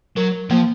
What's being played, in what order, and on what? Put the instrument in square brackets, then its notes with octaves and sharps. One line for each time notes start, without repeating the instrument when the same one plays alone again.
[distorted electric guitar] F#3 [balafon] A#4
[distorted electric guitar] F3 [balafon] A#3